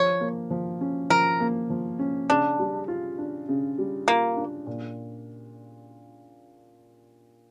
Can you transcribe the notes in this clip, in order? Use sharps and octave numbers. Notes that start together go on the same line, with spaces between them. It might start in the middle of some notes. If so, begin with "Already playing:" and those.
Already playing: F3 C#5
A#3
F3
C#4
F3 A#4
A#3
F3
C#4
C#3 D4
G3
F4
D4
C#3
G3
A#3 F4
D4
A#2